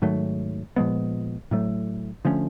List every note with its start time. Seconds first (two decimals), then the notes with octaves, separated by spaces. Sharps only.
0.02 G#2 D#3 F#3 A3
0.76 A#2 F3 G#3 B3
1.51 A2 F#3 A3
2.25 D3 F3 A3 C#4